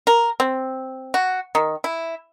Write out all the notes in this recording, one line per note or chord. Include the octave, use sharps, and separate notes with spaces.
A#4
C4
F#4
D#3
E4